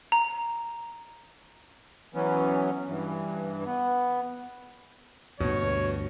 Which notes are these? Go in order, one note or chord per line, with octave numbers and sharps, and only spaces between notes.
A#5
E3 F#3 B3 C#4
G2 E3
B3
D2 G2 B2 C#5